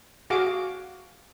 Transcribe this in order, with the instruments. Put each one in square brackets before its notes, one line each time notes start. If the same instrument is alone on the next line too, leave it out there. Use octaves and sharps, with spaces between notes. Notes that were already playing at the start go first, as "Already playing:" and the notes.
[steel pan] F#4 G#4 F5 D6